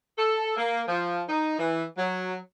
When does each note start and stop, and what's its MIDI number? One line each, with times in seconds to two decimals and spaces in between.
0.18 0.53 69
0.57 0.83 58
0.87 1.22 53
1.28 1.56 63
1.59 1.83 52
1.97 2.36 54